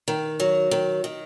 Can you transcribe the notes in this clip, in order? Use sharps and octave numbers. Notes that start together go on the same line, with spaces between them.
D#3
F#3
D#3
D#3